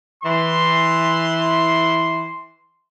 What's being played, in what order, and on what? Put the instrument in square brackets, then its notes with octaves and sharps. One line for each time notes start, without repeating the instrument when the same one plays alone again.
[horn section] E3 C6